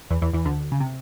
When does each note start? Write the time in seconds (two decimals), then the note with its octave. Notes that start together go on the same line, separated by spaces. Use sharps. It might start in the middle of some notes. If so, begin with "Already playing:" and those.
0.11 E2 E3
0.22 E2 E3
0.33 E2 E3
0.45 D2 D3
0.72 C#3
0.80 C3